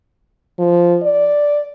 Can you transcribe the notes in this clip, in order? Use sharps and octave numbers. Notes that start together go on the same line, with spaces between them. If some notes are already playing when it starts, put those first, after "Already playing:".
F3
D5